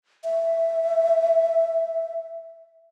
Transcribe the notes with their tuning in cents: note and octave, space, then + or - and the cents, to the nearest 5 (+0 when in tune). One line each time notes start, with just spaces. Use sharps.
E5 +5